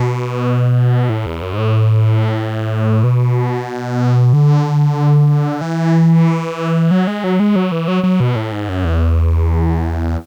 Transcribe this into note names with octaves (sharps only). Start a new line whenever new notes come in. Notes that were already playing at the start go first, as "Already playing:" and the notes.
Already playing: B2
A2
E2
F#2
G#2
A2
B2
D3
E3
F#3
G#3
F#3
G#3
F#3
E3
F#3
F#3
B2
A2
G#2
F#2
E2